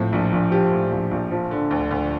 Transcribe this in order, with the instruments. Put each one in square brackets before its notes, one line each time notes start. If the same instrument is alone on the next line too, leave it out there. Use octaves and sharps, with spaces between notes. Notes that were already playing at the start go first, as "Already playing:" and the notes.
Already playing: [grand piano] A2 F3 C4
A#1
A#1
F3 G4
A2
A#1
A#1
F3
D3
D2
D2